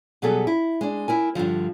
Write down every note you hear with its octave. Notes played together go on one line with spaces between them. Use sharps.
B2 F#3 G3 B3 G#4 A4
E4
G#3 D4
E4 A#4 G#5
G2 D3 D#3 F3